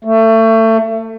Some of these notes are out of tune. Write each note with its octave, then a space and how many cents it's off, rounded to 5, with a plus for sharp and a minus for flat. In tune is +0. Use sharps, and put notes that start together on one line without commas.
A3 +25